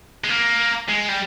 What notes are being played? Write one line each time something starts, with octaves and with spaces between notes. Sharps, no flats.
G#3
A#3
G#3
G3